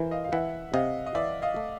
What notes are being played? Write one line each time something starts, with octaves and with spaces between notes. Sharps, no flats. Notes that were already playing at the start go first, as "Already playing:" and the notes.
Already playing: E3 A#4 C5
D#5 F5
F5
E3 E5 F#5
C3 D#5 F5
D#5
E3 D5 E5
D#5 F5
A3